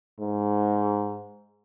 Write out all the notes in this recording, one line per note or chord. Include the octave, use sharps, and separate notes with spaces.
G#2